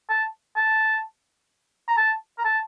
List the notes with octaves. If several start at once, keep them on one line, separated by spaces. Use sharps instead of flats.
A5
A5
A#5
A5
A#5
A5